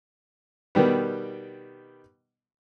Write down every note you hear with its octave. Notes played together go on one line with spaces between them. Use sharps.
B2 D#3 G3 B3